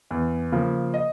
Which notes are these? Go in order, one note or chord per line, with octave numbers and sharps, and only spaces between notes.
E2
C#3 F3 A#3
D#5